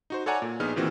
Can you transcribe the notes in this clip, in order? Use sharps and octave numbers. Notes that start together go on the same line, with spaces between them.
D#4 F#4 C5
A4 C#5 D5 F#5 G#5 A#5
A#2
A#1 B3 D#4 G#4 F6
A#2 D#3 E3 C4 F#4